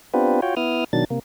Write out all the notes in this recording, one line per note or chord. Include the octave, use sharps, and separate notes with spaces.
B3 C4 D4 F4 G4 B4
F4 F#4 C#5 G5
B3 E4 D#6 F6
B2 D#3 F#3 D4 A6
C3 A#3